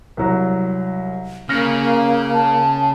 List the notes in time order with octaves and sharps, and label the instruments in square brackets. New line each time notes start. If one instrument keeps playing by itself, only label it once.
[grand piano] C2 F#3
[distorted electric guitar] C#3 [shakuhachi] A#3 [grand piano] F6 A#6 C#7
[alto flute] A5